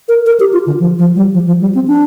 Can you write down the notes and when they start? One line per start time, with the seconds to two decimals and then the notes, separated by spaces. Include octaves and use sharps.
0.09 A#4
0.26 A#4
0.40 G4
0.53 F4
0.67 D3
0.80 F3
0.99 F3
1.16 G3
1.34 F3
1.47 F3
1.61 G3
1.75 C4
1.88 D4